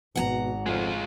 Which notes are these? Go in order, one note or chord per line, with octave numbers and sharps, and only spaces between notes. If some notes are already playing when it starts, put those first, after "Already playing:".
G#1 B2 F#5 G#5 A#5
F2 G#3 F4